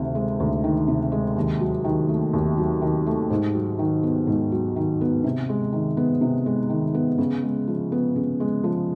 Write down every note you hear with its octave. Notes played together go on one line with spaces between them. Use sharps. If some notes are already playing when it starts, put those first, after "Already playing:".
Already playing: D2 C3 D#3
G#3
D2
D#3
C3
G#3
D#2
F#3
D#3
A3
D#2
F#3
D#3
A3
G#2
F#3
D#3
B3
G#2
F#3
D#3
B3
C3
G#3
D#3
B3
C3
G#3
D#3
B3
C#3
G#3
F3
B3
C#3
G#3
F3